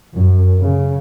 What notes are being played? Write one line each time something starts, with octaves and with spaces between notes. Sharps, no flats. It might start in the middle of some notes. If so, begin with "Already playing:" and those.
F#2
C#3